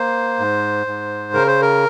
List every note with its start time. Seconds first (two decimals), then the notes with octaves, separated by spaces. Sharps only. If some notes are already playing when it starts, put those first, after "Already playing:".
Already playing: A#3 C5
0.39 G#2
0.87 G#2
1.33 C#3 A#4
1.47 C5
1.62 A#4